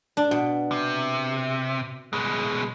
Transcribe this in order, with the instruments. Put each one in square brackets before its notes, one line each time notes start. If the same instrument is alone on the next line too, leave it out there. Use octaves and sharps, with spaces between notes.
[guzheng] D4
B2
[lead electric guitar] C3
B2 G#3